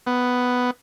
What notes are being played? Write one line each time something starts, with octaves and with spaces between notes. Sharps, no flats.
B3